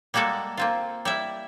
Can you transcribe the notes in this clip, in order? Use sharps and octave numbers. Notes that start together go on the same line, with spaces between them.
G3 G#3 A#3 F#4 A4
A#3 C4 F4
G3 E4 E5